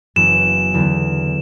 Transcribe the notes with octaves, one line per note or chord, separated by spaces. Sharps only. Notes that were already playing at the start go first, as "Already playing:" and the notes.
F#1 F#2 E3 B3 E7
E2 D3 F#3 B3 E4